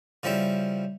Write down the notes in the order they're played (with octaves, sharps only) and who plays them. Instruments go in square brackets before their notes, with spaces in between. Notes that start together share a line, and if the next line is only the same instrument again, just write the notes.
[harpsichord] C#3 F3 G3 E4